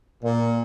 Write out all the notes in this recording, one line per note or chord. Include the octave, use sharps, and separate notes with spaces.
A#2